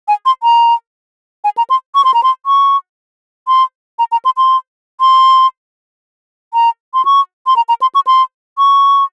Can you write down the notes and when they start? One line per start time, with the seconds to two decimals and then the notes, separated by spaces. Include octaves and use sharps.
0.08 G#5
0.26 C6
0.43 A#5
1.44 G#5
1.57 A#5
1.70 C6
1.95 C#6
2.05 C6
2.14 A#5
2.23 C6
2.46 C#6
3.48 C6
3.99 A#5
4.12 A#5
4.25 C6
4.37 C6
5.01 C6
6.54 A#5
6.94 C6
7.05 C#6
7.47 C6
7.56 A#5
7.69 A#5
7.82 C6
7.95 C#6
8.07 C6
8.58 C#6